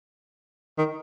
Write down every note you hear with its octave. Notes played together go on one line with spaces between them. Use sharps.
D#3